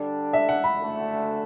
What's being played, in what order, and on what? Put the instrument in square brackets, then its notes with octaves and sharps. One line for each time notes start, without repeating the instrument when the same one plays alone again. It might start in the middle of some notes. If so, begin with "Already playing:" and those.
Already playing: [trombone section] D3 G3 D4
[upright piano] E5
F#5
B5
[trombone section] D2 D3 A3